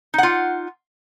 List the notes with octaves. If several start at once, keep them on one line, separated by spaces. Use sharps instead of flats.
D#4 F4 F#5